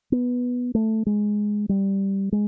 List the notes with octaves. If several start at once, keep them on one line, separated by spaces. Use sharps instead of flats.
B3
A3
G#3
G3
G#3